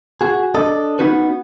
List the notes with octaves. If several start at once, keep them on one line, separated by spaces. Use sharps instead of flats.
F#4 G#4
D4 A4 D#5
B3 C#4 D#4 F#4 B4